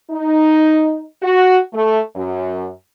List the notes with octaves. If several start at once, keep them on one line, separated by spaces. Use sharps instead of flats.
D#4
F#4
A3
F#2